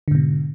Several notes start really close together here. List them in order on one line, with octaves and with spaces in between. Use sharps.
D3 G#2 B2